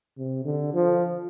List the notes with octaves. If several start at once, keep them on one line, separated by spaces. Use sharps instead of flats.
C3
D3
F3